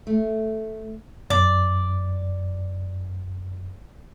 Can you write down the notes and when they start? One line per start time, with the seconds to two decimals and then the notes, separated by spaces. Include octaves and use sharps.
0.07 A3
1.30 F#2 D5